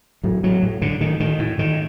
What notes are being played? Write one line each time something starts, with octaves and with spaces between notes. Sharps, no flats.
A2 F#3
A2 F#3
A2
A2 D3
A2 D#3
A2 D#3
A2
A2 D#3